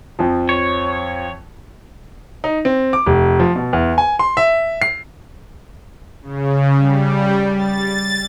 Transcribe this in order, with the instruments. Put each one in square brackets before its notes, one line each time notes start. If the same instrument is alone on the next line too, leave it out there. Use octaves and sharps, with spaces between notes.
[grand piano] F2 F3
[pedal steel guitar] C#5
[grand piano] D#4
C4
D6
F1
F3
B2
E2
G#5
C6
E5
C7
[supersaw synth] C#3
G3
A6